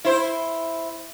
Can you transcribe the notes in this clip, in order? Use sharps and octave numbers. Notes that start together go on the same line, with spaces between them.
E4 C5